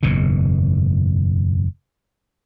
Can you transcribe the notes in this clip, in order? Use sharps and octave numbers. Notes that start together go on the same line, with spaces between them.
F#1 E2 G#2 B2